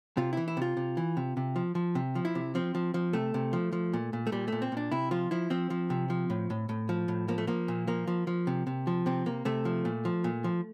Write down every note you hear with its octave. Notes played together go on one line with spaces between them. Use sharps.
C3 F4
E3 E4
E4
C3 F4
C3
E3
C3
C3
F3
F3
C3
F3
E4
C3
F3 C4
F3
F3
C3 A3
C3
F3
F3
A#2
A#2
A3
A#2 G3
A#2 A3
C4
A#2 D4
C3 E4
F3 F4
F3 E4
F3 C4
F3
C3
F3
A2
A2
A2
F3
A2
F3 A#3
A3
F3 A#3
A#2
F3 A#3
F3
F3
C3
C3
F3
C3 C4
C3 A#3
C3 A3
F3
A#2
F3
A#2
F3